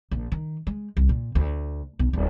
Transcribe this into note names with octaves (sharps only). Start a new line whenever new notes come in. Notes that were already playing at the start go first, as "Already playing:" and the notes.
A#1
D#3
G#3
C2
A#2
D2
B1
D1